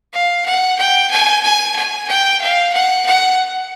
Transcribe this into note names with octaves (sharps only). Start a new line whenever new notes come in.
F5
F#5
G5
G#5
G#5
G#5
G5
F5
F#5
F#5